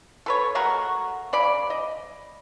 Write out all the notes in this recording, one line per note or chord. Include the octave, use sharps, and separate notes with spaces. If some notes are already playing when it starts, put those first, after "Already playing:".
A4 B4 C#5
G#3 A3 F#4 A#4
C#3 D5 B5
D#5